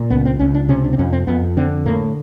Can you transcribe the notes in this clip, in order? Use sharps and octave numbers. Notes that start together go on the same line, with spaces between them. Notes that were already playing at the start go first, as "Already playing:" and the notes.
Already playing: A#2
C#2 B3
C4
C#2 C#4
D4
C3 C#4
D4
C4
F2 C#4
C4
F2 B3
D3 C4
A2 A#3